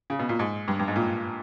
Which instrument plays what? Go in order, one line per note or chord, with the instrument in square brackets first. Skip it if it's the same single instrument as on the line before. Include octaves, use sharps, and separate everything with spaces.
[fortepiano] C#3
B2
A#2
G#2
G2
G2
G#2
A#2